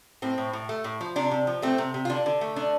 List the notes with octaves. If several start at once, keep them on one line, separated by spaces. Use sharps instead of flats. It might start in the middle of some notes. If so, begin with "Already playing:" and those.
A2 C4
A2
A2
A3
A2
F3
C3 D4
C3
F3
A3 C4
C3
C3
F4
D3 D4
D3
A3
D3 D4